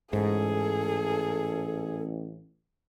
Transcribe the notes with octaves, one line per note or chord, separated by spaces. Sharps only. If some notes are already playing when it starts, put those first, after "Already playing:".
A1 G#2 G#4 A4